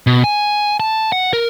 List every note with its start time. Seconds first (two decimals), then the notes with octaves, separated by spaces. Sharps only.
0.07 B2
0.24 G#5
0.80 A5
1.12 F#5
1.33 A#4